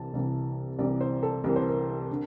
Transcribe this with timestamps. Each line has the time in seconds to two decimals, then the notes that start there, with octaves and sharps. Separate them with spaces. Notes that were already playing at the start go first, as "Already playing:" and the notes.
Already playing: C2 C3 E3 A5
0.13 C2 C3 E3
0.79 C2 C3 E3 D5
1.01 C5
1.23 A4
1.44 C2 C3 E3 A#4
1.56 C5
1.68 A#4
2.11 D3